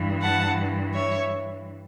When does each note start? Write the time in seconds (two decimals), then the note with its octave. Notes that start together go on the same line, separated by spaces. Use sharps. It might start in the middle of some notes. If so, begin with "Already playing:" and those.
Already playing: G2 E3
0.21 F#5 A5
0.94 C#5 E5